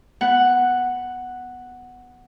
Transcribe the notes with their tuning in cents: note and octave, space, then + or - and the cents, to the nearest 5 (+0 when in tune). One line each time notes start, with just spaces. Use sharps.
B3 +0 F#5 +0